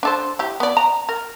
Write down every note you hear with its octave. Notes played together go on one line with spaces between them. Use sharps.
D4 A4 C5
E4 G4
B3 D5
A#5
A#4